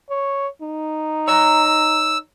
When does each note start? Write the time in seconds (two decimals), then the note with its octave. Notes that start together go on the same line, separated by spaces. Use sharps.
0.10 C#5
0.62 D#4
1.28 C#5 A#5 E6